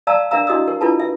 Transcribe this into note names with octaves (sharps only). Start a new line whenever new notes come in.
D5 F5 A5 A#5 E6
D4 A#4 E5 F5 A#5 E6
D4 E4 F#4 D#5 D#6 E6
A#4
D4 E4 F4 A4 B4 A5
E5